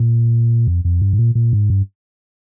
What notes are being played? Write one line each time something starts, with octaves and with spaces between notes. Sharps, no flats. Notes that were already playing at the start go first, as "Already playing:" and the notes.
Already playing: A#2
F2
F2
G2
G#2
A#2
A#2
G#2
G2